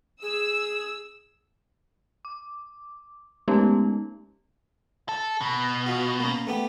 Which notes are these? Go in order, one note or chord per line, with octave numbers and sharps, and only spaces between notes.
G#4 E6
D6
G#3 A3 B3 C#4 D#4 G4
A4
B2
F4 F#4
A#3 C#4
A3 B3 G4